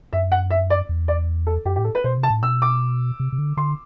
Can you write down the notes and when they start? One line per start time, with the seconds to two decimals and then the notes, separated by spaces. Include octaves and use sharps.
0.13 F#2 E5
0.32 F#5
0.50 E5
0.70 D5
0.89 E2
1.08 D5
1.47 A4
1.65 F#2 G4
1.76 G4
1.78 A2
1.84 A4
1.95 B4
2.04 B2 C5
2.18 C3
2.23 A5
2.30 A2
2.42 B2 E6
2.62 D6
3.20 C3
3.32 C3
3.38 D3
3.57 D3 C6